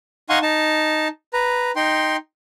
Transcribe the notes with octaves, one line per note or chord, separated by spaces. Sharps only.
D#4 F5 F#5 G#5 C6 C#6
D#4 A5
B4 A#5
D#4 G5 C6